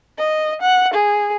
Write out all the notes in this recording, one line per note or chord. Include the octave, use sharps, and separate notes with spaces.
D#5
F#5
G#4